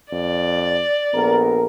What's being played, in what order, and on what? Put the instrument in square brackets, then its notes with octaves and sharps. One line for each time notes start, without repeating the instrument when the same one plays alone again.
[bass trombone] F2 [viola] D5
[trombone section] A#1 A4 A#4 [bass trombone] B3